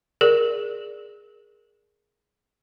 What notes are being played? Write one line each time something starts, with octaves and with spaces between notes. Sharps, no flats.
G#4 A#4 D5